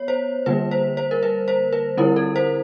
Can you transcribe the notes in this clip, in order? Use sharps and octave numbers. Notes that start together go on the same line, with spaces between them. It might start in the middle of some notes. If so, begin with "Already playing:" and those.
Already playing: B3 C#5
C5
D3 G3 A#3 B4
C5
C5
A#4
B4
C5
B4
D3 G3 C4 E4 A#4
A4
C5